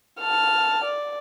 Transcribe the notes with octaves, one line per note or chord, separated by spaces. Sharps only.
A5 F6
D5